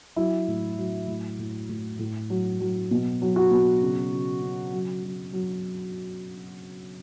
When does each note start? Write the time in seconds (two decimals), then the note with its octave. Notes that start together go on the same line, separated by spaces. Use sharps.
0.16 F#3 E4
0.48 A2
0.78 F#3
1.08 A2
1.39 A2
1.69 A2
1.99 A2
2.30 F#3
2.61 F#3
2.91 B2
3.22 F#3
3.36 F#4
3.51 B2
3.82 C#3
4.13 C#3
4.42 C#3
4.73 F#3
5.03 F#3
5.33 F#3